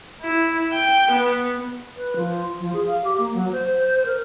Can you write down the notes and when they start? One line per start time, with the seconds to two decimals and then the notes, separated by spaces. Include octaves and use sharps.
0.22 E4
0.73 G5
1.12 B3
1.96 B4
2.16 F3
2.60 F3
2.73 G#4
2.87 F5
3.05 G4
3.18 A#3
3.34 F#3
3.52 C5
4.06 A#4